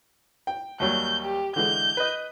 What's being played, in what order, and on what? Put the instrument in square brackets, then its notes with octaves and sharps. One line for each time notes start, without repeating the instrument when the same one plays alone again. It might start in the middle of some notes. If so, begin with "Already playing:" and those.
[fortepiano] G5
[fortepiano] D#2 F#3 G3 [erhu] G6
[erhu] G4
[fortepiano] D3 E3 G#3 [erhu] G6
[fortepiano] B4 D#5